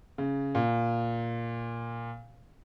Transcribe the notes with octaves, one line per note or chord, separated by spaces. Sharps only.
C#3
A#2